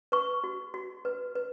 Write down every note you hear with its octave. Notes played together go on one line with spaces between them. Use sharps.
B4 C#6
F#4
F#4
B4
B4